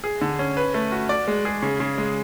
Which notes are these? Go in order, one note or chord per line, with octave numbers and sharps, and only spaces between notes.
G#4
D3
C#4
B4
A3
F#4
D5
G#3
G#4
C#3
C#3
G#3